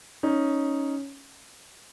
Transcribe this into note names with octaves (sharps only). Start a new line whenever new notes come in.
C#4 D#4